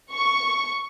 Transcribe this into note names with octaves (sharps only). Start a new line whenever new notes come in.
C#6